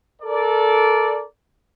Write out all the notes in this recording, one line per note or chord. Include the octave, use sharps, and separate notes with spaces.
A4 A#4 D5